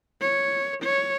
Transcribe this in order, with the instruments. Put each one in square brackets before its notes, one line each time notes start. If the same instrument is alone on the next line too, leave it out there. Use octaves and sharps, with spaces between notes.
[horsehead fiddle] C#5
C#5